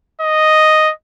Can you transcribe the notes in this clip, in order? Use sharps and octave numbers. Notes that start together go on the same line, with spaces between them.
D#5